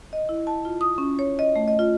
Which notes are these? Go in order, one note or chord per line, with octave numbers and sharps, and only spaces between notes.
D#5
E4
A5
F4
D#6
C#4
C#5
D#5
A3
D#5
F4